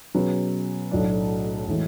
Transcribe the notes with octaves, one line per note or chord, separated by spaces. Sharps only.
B2 F#3 C#4 G#4 B4
B1 A2 F#3 A3 D4
A2 E3 G#3